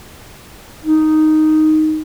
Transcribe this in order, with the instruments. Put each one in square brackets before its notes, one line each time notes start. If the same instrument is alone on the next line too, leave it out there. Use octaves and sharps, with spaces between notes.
[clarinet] D#4